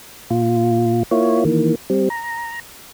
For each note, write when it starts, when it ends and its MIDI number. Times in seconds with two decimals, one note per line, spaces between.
0.31 1.03 46
0.31 1.03 65
1.11 1.44 58
1.11 1.44 64
1.11 1.44 65
1.11 1.44 73
1.45 1.75 51
1.45 1.75 52
1.45 1.75 58
1.90 2.09 55
1.90 2.09 60
2.10 2.60 82